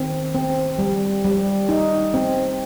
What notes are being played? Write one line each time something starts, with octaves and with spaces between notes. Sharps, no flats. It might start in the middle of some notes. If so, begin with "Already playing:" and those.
Already playing: D#3 C4
C4
G3
G3
D#4
C4